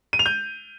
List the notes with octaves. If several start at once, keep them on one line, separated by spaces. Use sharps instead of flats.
D#7
F7
G6